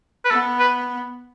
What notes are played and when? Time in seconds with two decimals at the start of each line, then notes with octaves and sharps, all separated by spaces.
0.25 B4
0.31 B3 A4
0.59 B4